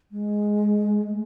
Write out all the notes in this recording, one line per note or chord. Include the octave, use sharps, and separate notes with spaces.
G#3
A3